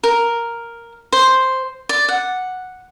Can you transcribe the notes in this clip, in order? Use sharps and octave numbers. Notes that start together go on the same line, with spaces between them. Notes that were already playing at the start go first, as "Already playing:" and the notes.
A#4
C5
D5
F#5